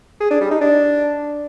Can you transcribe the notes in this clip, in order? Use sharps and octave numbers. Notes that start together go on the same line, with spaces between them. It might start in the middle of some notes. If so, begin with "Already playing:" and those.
G#4
D4
G3
D#4
D4